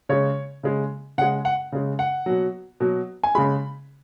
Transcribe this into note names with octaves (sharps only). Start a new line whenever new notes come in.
C#3 G#3 C#5
C#3 G#3
C#3 G#3 F#5
F#5
C#3 G#3
F#5
B2 F#3
B2 F#3
G#5
C#3 G#3 B5